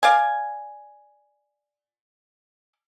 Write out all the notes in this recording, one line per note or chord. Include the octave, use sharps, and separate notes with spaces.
D5 F5 G#5